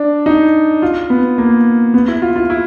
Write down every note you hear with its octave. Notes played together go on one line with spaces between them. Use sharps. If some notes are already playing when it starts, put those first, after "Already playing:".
Already playing: D4
D#4
F4
B3
A#3
B3
E4
F4
F4
E4